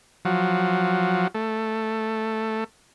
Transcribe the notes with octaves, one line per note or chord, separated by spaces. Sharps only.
F3 F#3
A3